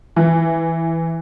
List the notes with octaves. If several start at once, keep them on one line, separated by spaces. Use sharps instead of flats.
E3